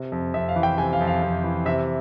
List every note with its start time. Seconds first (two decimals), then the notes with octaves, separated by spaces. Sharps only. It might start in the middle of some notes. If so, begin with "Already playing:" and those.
Already playing: C3
0.12 F2
0.34 F2 E5
0.49 F5
0.56 E3
0.63 G5
0.78 C3 G#5
0.93 F5
1.00 F2
1.07 F5
1.22 F2
1.44 E3
1.66 C3 E5